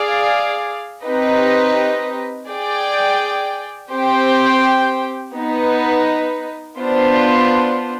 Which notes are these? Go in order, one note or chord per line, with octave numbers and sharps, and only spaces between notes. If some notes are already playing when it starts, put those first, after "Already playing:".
Already playing: G#4 D5 F5
C4 D#4 G4 B4 D#5
G#4 D5 G5
C4 G4 C5 G5
B3 D#4 B4
B3 D4 F4 C5